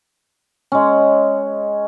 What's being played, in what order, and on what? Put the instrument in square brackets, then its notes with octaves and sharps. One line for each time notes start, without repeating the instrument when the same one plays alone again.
[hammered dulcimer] G#3 C#4